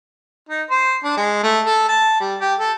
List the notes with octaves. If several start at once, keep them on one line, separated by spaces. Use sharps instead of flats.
D#4
C5
D4
G#3
A3
A4
A5
G3
G4
A4